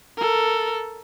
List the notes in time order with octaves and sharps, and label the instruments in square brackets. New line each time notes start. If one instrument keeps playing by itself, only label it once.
[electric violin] A4 A#4